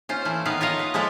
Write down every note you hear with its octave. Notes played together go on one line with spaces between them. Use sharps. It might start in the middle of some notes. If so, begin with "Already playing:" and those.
C#4 F4 C5
E3 A3 E4
D#3 B3 B4 F5 A#5
F4 A#4 C#5 D#5 F5
B4
F3 G#3 E4 A4 E5